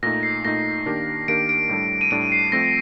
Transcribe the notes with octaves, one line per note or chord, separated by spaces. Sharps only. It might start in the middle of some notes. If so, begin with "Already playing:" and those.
A#2 A3 D#4 A#6
C7
A#2 A3 D#4 A#6
D#3 A#3 D4 G4 A#4
D#3 A#3 D4 G4 A#4 D7
D7
A2 G3 D4 A4
D#7
A2 G3 D4 A4 D7
C7
F3 A3 C4 A#6